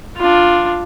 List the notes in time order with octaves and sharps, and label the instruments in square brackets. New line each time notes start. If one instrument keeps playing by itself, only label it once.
[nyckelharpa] D4 F4